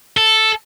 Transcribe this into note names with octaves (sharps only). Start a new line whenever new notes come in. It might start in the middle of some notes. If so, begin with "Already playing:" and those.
A4